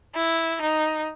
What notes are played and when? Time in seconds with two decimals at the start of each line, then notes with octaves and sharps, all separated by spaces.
0.16 E4
0.61 D#4